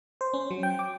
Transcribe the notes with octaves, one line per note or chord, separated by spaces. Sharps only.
C5
C#4
F#3
G5
D6